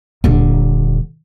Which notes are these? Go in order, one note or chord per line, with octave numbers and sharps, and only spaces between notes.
D#1 D3